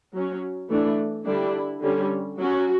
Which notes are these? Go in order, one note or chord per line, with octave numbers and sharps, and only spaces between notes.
F#3 C#4
E3 A3 D4
D3 G3 D4 E4
D3 G3 C#4
F#3 C#4 F#4